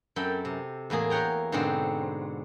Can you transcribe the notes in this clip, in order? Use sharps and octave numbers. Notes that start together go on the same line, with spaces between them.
F#2 C4 A4 G5 B5
C3
E2 A2 A#3 G#4
A#4 C#5 F#5 G5 A#5
G#2 B2 D3 C4